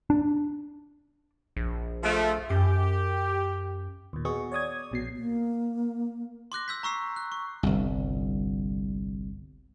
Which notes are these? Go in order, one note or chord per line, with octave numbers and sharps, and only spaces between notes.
D4
A#1
F3 A3
F#2 G4
D#2 A#2
B3 F#4 G#4 D#5 C#6
C#5 D5 D#6 G#6
A#1 B2 C7
A#3
C6 D6 F#6 A#6
E6 G6 B6
A#5 C#6 E6 C7
F#6
C#6
G1 C2